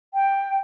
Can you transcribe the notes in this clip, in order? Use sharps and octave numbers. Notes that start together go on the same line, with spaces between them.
G5